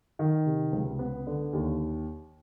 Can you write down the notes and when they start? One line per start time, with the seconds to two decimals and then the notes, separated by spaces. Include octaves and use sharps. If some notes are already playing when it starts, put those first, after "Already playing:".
0.19 D#3
0.46 C3
0.73 C#2
0.99 B3
1.27 D3
1.53 D#2